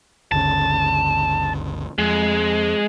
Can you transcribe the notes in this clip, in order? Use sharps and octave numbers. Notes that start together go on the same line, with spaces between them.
G1 D2 C#3 A5
F2 G#3